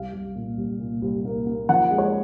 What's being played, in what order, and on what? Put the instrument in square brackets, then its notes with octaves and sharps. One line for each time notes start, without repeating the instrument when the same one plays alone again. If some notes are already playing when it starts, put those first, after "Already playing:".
Already playing: [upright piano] C2 F5
C2
A#2
C2
A#2
C2
A#3
A#3
F3 F#5
G#3
C#5